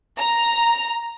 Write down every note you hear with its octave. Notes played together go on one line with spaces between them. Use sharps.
A#5